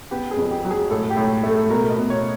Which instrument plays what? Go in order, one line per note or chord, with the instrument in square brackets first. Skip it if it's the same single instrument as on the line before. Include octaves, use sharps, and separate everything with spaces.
[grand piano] B3 G4
G#4
F2
G4
F#3
G#4
A2 A4
G4
A2
A3
A4
B2 A#4
D#5
B2
C#5